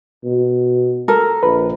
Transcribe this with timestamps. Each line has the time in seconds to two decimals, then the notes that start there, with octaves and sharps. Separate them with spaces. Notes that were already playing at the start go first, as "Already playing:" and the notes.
0.24 B2
1.08 A4 A#4
1.43 A#1 B4